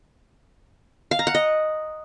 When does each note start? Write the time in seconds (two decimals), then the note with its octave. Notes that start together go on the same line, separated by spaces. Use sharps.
1.11 F5
1.19 A#5
1.27 F#5
1.35 D#5